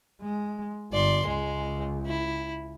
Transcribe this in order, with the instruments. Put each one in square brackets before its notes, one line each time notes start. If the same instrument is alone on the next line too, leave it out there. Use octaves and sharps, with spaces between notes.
[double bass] G#3
[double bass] G1 [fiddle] D5 C6
[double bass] C#2 [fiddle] G#3
[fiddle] E4